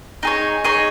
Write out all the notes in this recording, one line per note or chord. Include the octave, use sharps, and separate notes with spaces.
D#4 G#4 C#5
D#4 G#4 C#5